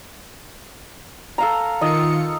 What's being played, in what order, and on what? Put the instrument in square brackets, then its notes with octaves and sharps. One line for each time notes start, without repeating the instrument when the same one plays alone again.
[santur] A4 F5 A#5
[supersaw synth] D#3 F4 C#7 [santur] D#5